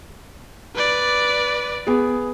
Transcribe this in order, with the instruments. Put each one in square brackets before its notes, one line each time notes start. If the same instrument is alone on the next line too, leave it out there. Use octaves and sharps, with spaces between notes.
[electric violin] B4 D5
[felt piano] B3 G#4